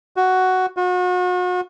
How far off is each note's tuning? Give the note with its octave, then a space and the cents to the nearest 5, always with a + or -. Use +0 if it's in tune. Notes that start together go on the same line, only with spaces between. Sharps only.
F#4 +5
F#4 -40